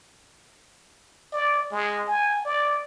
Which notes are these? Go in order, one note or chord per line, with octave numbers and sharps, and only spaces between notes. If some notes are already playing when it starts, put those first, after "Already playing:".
D5
G#3
G#5
D5